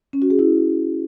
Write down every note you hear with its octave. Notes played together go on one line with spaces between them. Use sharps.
C#4
F#4
G#4
E4